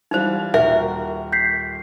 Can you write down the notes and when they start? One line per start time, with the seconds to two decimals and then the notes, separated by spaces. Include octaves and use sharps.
0.11 E3 G3 D#4 F4 C5
0.54 D#1 F#4 A#4 E5
1.32 G6 B6 C7